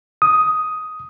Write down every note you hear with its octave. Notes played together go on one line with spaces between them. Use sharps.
D#6